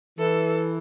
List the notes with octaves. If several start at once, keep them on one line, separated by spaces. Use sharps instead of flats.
E3 A4